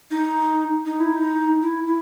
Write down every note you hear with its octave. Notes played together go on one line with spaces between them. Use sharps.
D#4
D#4
E4
D#4
E4
E4